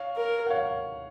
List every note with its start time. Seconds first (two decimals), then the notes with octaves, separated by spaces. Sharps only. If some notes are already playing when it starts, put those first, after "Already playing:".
Already playing: C#5 F5
0.16 A#4
0.47 F#5
0.50 C#5 F5